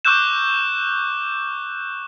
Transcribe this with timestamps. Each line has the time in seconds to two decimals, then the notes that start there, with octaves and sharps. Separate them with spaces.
0.05 C#6 D6 E6 F#6 G6 E7